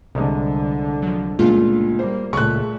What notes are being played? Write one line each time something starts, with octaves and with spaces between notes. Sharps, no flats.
C2 D3 G3 G#3
F3 F#3
C#2 A#2 A3 D4 F4
G3 A#3 C5
C#2 A#2 A3 G#4 A4 C#6 F#6